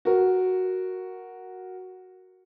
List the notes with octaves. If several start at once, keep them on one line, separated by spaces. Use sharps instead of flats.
F#4 A#4